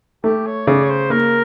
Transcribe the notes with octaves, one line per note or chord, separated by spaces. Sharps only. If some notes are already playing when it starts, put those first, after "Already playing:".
A3 G4
C#5
C#3 D5
C#5
C5
A#3 A#4